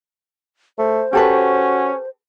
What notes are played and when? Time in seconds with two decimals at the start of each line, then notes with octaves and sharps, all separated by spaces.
0.78 A3 C5
1.13 C#4 F#4 G4 A4 B4